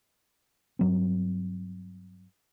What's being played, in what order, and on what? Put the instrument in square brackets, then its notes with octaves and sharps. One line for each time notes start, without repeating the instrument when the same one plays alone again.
[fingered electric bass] G2 F#3 C4